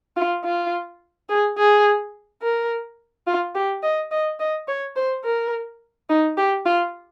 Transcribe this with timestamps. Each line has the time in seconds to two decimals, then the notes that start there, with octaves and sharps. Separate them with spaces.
0.16 F4
0.45 F4
1.29 G#4
1.58 G#4
2.42 A#4
3.27 F4
3.55 G4
3.83 D#5
4.11 D#5
4.40 D#5
4.68 C#5
4.96 C5
5.25 A#4
6.09 D#4
6.37 G4
6.65 F4